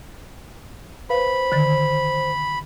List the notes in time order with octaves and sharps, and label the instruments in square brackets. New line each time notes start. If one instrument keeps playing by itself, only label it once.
[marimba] B4 F5 [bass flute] C5 [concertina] B5
[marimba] D3 D#3 A6